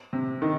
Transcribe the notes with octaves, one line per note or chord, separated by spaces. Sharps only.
C3
D#3